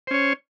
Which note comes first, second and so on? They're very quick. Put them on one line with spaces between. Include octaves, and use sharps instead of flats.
C5 C#4 C#5